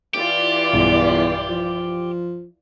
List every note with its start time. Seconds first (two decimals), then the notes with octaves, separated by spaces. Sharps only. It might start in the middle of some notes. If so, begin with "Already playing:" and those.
0.14 E3 F4 G4 D5
0.73 B1 E2 G2
1.49 F3